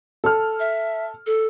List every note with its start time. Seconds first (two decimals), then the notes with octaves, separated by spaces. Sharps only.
0.24 A4 F6
0.60 E5
1.26 A4